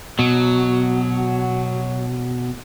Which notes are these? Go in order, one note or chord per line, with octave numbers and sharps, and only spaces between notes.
B2 F#3